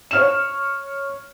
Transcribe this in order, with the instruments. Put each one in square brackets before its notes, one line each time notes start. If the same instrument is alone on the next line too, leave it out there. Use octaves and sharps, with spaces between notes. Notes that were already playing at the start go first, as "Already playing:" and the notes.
[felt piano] C#5 F6 E7